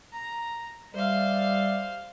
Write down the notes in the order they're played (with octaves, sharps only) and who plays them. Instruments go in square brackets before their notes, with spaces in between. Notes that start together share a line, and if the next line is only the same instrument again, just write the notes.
[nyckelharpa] A#5
[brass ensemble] G3 D5 E5 [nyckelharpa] C5 F5